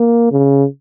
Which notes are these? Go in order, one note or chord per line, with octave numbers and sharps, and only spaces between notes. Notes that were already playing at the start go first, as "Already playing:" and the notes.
Already playing: A#3
C#3